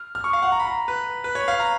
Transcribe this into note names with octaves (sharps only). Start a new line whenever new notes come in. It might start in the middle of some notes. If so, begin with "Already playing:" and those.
Already playing: F6
F6
C#6
F5
F#5
A#5
B5
A#5
B4
B4
C#5
F5
A#5